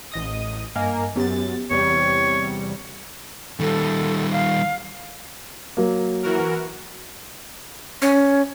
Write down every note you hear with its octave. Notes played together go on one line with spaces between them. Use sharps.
A1 D#5 D#6
G2 A#3 A#4 D#5 G#5
F#2 B3 G4 A6
E2 C3 G3 C#5
D#3 G3 A4
F5
F#3 A#3
E3 F#4 A#4
C#4